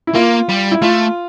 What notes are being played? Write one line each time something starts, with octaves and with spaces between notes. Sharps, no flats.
E4
A#3 F4
G3
E4
A3 F4